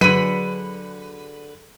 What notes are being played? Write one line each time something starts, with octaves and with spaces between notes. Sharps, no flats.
D3 F#3 G#4 B4 D#7